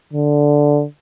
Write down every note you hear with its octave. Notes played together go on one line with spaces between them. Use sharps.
D3